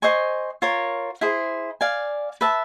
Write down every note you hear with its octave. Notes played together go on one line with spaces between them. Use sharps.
C5 D#5 G#5 C#6
F4 A#4 C#5
E4 G#4 C5
D5 F5 G#5
B4 E5 A5